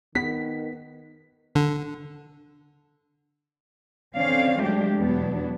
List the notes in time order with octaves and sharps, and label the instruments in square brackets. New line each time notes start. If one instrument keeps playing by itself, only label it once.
[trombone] D#3 [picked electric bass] B3 [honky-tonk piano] B6
[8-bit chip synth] D3
[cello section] D3 C4 C#4 D5 F5
F#3 G#3 A3 D4 G4
E2 B2 F#3 B3 D4